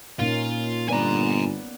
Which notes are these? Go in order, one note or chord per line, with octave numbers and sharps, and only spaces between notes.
A#2 A#3 C#4 D#4 F4
G1 B3 B4 D5 G#5 A#5